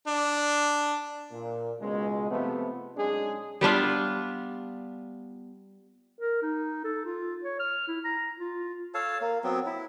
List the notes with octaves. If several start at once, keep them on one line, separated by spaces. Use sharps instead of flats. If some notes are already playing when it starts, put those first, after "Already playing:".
D4
A#2
C#2 B2 G#3
C3 F3 A3 B3
B1 G#3 C#4 D4 G#4
G3 B3 D4 F4
A#4
D#4
A4
F4
C#5
F6
E4
A#5
F4
A4 C#5 F5 A5
A#3
F#3 B3 C4
E4